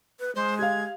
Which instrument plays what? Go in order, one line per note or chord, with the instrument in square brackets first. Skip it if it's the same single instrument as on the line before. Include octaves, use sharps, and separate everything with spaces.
[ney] B4
[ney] G#3 [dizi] C5
[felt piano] G4 F5 [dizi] G#6